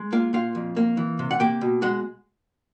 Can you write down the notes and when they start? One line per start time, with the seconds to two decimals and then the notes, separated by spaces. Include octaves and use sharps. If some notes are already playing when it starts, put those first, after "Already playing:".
Already playing: G#3
0.12 A#3 F4 F5
0.33 A#2 F4 F5
0.55 F2
0.76 A#3
0.97 E3
1.19 C3
1.31 F#5
1.40 A#3 G4 G5
1.61 B2
1.82 G#3 F#4 F#5